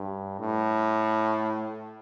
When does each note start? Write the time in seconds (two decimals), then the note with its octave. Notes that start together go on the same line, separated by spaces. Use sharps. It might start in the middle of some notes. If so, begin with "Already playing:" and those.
Already playing: G2
0.39 A2